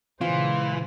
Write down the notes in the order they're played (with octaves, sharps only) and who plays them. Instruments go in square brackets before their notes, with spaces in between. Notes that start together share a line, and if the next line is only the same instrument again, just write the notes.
[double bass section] A#2 C#3 G#3 [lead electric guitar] E3 [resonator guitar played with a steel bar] F4 [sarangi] C5